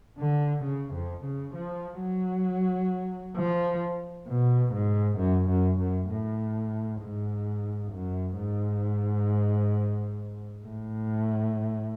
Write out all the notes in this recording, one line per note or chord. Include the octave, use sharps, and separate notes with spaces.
D3
C#3
F2
C#3
F3
F#3
F3
B2
G#2
F#2
F#2
F#2
A2
G#2
F#2
G#2
A2